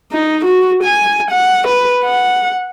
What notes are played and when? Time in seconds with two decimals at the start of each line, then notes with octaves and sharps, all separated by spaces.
0.12 D#4
0.45 F#4
0.84 G#5
1.31 F#5
1.67 B4
2.04 F#5